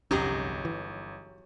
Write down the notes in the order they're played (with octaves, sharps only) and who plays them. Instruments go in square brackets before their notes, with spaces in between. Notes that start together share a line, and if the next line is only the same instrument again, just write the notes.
[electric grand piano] G1 [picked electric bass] C2 F2 C#4 [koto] F#3 D#4 G#4 [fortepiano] G4
[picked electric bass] E3